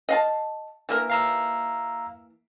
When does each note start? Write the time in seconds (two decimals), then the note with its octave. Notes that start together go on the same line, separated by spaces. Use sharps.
0.09 D#5 F5 A5
0.89 E3 A#3 A#4
1.10 F5 A#5 E6